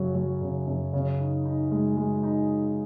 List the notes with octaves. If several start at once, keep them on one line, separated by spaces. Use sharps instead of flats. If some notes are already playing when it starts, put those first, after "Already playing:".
Already playing: F#2 C#3 F#3
F#3
C#3
F#2
C#3
D#4
D#4
G#3
G#3
D#4